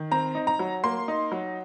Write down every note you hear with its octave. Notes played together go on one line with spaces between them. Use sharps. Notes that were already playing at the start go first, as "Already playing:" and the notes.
Already playing: D#3
C4 A#5
D#4
A#5
F#3
A#3 C6
D#4
F#3